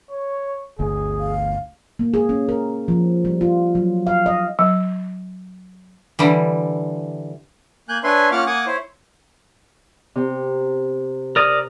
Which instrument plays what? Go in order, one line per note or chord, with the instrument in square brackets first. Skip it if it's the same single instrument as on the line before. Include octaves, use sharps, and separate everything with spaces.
[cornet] C#5
[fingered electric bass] G1 D2 [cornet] G#4
[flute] F5
[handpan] A#3
G#4
C#4
A#4
F3
G3
F4
F#3
F5
D#5
[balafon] F#3
[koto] D3 E3 G3
[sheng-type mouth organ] A#3 G#5 F#6 G6
D4 B4 C#5 E5 G#5 C6
A#3 C#4 F4 F#5 D6 F6
A#3 F#5 G#5 D6 D#6
E4 C5 C#5
[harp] C3
[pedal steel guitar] A#4 D5 D#6